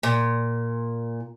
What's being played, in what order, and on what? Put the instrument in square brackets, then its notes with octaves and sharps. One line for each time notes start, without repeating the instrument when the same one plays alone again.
[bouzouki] A#2